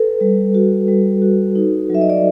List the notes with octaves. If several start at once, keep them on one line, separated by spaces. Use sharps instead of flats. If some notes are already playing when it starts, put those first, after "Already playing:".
Already playing: A4 B4
G3
F#4
G3
F#4
D#4
F#3 E5
D#5
D5